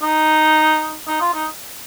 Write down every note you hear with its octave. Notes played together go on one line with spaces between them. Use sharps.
D#4
D#4
F4
D#4